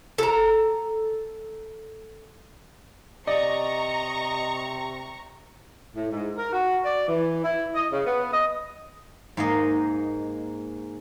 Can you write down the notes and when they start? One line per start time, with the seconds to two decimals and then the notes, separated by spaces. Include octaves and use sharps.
0.18 A4 A#5
3.27 C3 D5 D#5 A#5 C#6
5.96 A2
6.11 G#2
6.36 A#4
6.53 F#4
6.84 D5
7.07 E3
7.44 E4
7.75 D#5
7.91 C#3
8.06 B3
8.33 D#5
9.37 G#2 A#3 D#5